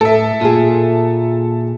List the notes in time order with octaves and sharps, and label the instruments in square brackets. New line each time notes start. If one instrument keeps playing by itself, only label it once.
[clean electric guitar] A2 [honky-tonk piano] A4 E5
[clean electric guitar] A#2 [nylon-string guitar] F4 G#4